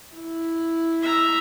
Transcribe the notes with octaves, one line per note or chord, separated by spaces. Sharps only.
E4
E5 A#5